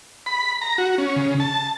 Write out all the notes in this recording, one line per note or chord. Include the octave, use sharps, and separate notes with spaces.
B5
A#5
F#4
C#4
C#3
A5